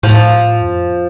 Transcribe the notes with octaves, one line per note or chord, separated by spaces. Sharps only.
A2 F3
F2